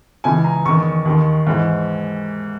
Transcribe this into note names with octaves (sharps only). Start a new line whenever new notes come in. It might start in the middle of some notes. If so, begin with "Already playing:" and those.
C#2 C#3 E3 G#5
A#5
E2 D#3 C#6
D#2 D#3
G#2 E3